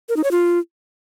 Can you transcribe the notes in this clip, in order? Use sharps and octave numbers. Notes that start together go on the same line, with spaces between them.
A#4
D#4
C#5
F4